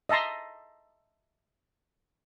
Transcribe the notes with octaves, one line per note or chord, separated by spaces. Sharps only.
D#5 E5 A5 A#5 C6